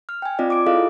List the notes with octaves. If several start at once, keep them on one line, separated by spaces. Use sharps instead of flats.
F6
G5 G#5
C4 F4 D5 D#5
D6 D7
E4 F4 G#4 A4 D#5 F5